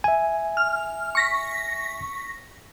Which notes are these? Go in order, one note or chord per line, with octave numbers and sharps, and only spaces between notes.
E5 G#5
F6
C#6 A#6 B6